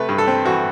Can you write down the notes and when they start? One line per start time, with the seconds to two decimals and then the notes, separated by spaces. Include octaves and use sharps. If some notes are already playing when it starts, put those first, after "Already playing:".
Already playing: C3 A3 B4
0.09 G2
0.18 A4
0.27 C4
0.45 E3 F#4